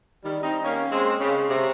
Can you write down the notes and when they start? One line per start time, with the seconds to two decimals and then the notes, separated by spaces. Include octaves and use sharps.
0.23 D#3 G3
0.43 C4 D#4
0.63 A#3 C#4
0.92 G#3 C4
1.21 C#3
1.50 C3